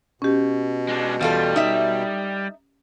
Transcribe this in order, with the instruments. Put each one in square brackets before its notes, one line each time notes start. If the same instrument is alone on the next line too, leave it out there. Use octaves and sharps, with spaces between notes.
[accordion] B2 [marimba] C#4 G4
[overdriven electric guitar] G#3 D4
[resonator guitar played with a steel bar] E2 F4 A4 [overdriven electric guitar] G3
[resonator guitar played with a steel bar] D#4 E5